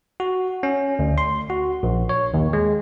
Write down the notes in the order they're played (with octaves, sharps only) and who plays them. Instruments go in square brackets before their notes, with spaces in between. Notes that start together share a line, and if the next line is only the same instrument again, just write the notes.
[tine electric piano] F#4
C#4
D2
C6
F#4
A#1
C#5
D#2
G#3